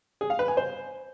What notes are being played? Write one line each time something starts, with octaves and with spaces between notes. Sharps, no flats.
G#4
F5
B4
G#5
C5